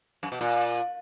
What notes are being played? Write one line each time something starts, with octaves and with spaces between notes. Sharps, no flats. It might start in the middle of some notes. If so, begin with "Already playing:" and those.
F#2
B2
A#2